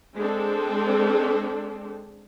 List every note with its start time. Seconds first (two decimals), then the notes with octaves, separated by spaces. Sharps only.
0.17 G#3 C4 D4 A4